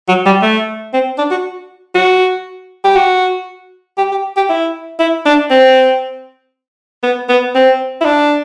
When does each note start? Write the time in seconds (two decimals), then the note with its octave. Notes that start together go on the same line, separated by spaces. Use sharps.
0.08 F#3
0.26 G3
0.42 A3
0.94 C4
1.18 D4
1.31 F#4
1.95 F#4
2.84 G4
2.96 F#4
3.98 G4
4.12 G4
4.37 G4
4.50 E4
4.99 E4
5.26 D4
5.50 C4
7.03 B3
7.29 B3
7.55 C4
8.01 E4
8.05 D4